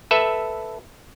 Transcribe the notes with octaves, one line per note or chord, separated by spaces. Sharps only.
A4 B4 E5